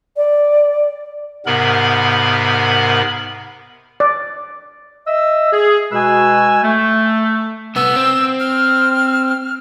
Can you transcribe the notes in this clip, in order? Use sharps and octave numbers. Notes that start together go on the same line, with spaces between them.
D5
G#2 C3 B3 A#4 B5
D5
D#5 E5 E6
G#4
B2 G#3 F#4 B4 G#5 E6
A3
C2 B3 E6
C4
F6